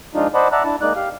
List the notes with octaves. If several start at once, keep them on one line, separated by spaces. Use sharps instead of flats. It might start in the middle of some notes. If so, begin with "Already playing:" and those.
F3 G#3 D4 D#4 F4
C5 D5 D#5 F#5 A5 B5
D5 E5 F#5 A5 A#5 F#6
D4 E4 A5
G#3 A#3 D#4 D5 F#6
G4 F5